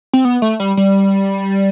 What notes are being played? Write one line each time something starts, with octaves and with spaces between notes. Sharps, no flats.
C4
B3
A3
G3
G3